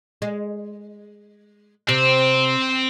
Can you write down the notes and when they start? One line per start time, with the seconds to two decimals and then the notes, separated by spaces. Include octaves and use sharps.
0.22 G#3
1.89 C3 C4